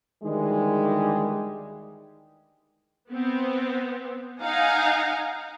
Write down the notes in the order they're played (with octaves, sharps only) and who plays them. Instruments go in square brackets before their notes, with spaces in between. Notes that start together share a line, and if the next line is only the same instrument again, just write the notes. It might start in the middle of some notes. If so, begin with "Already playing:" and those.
[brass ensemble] D2 D#3 E3 G3 G#3
[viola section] B3 C4
D#4 F5 F#5 G#5 A#5